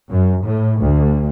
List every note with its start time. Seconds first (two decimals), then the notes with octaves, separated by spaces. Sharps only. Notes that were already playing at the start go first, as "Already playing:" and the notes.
0.10 F#2
0.45 A2
0.82 D2